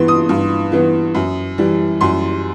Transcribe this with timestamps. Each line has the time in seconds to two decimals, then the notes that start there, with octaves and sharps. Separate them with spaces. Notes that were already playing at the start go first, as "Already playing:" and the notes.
Already playing: G2 E3 B3 C6
0.08 D#6
0.29 G2
0.72 E3 B3
1.15 F#2
1.58 E3 G3
2.01 F#2 C6